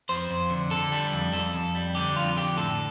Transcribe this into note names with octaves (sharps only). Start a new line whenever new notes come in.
F2 C5
F2
D3
D3 A4
G3
F2
F2 A4
F2
G3
D3 G4
F2 F4
D3 G4
A2 A4